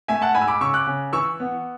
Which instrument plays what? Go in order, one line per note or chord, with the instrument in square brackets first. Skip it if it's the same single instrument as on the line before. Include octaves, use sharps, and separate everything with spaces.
[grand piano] A3 E5 G#5
F#5 A5
G#2 G#5 B5
E6
B5 D6
C#3 C#6 E6
D6 F#6
C#3
E3 C#6 E6
B3